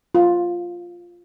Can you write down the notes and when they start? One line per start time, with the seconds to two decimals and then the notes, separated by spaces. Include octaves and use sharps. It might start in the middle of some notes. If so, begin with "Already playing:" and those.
0.15 F4